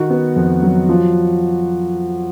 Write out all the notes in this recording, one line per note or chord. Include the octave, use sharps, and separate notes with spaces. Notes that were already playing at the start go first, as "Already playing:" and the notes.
Already playing: D#3 F#4
B3
F2
F#3
F3